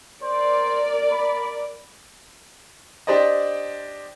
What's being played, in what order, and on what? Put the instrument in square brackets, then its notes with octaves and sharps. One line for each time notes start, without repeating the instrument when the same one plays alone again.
[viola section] A#4 D5 [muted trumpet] C5
[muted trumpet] B5
[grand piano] D4 G4 C5 D5 D#5